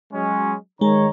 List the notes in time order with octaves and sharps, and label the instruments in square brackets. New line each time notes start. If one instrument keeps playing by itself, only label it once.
[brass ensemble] F#3 G#3 C#4
[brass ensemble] D#3 C#5 A#5 [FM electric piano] G#3